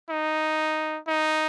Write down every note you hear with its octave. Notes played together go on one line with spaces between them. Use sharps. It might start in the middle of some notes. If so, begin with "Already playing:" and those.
D#4
D#4